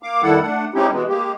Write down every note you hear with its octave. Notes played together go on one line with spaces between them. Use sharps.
A#3 F5 D6
F2 D#3 G3 E4 A4 F#5
A3 D4 F#5
G#3 C4 C#4 D#4 E4 G4
B2 E3 G#3 B3
G#3 A#3 G4